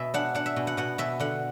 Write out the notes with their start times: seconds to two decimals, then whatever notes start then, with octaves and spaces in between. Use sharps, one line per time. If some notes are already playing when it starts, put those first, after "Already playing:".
Already playing: B2 E5
0.14 D4 F#5
0.35 D4 F#5
0.46 E5
0.56 B2
0.67 F#5
0.77 B2 F#5
0.98 B2 E5
1.20 D3 F#5